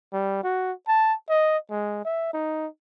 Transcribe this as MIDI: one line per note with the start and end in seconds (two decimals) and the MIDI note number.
0.13 0.43 55
0.43 0.72 66
0.88 1.13 81
1.29 1.58 75
1.71 2.02 56
2.05 2.29 76
2.33 2.67 63